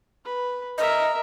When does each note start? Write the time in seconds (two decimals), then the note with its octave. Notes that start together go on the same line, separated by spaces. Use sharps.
0.25 B4
0.78 A#4 D#5 E5